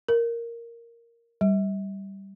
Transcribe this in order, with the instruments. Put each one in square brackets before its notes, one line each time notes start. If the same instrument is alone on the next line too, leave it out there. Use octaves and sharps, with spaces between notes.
[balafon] A#4
G3